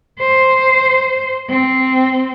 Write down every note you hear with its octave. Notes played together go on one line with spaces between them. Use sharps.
C5
C4